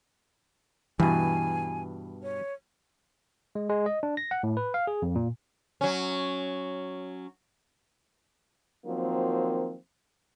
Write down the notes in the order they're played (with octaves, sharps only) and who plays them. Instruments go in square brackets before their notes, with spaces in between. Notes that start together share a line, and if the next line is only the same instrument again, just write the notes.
[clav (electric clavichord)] G2 B2 [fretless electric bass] E3 [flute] G#5
[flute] C#5
[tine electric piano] G#3
G#3
D#5
D4
A#6
F#5
A2
B4
F5
G#4
F2
A#2
[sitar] F#3 C#4
[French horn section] D#3 F3 F#3 A#3 C4